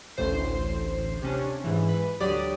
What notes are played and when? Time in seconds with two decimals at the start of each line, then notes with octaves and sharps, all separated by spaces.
0.17 A1 D2 A2 C5 C7
1.22 C3 C#4 D4
1.64 G#2 E3
1.89 B4
2.20 D2 F#3 G4 D5 D#6